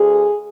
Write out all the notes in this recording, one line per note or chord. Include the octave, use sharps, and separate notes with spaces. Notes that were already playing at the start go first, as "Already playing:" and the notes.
Already playing: D2 G#4